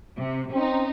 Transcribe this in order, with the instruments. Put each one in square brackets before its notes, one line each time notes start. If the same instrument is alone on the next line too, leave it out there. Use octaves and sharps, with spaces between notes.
[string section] C3
[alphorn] C4 [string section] C#4 D#4